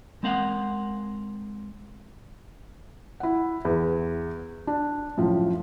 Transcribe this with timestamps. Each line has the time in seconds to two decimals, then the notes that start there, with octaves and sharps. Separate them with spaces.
0.23 G#3 C4 A#4 F5 F#5
3.20 E4 F#5
3.65 E2
4.67 D4
5.17 F#2 A2 F3